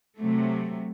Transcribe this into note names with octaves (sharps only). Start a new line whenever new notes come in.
C3 F#3 A3